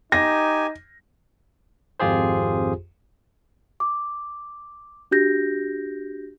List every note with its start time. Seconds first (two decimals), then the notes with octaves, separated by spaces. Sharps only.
0.12 D#4 G4 G#5 A#6
2.00 G#1 F2 F4 G4 G#4 C5
3.80 D6
5.11 D4 F#4 G4 G6 A#6